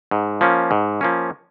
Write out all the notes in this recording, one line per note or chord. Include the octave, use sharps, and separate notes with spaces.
G#2
F3 A#3 C#4
G#2
F3 A#3 C#4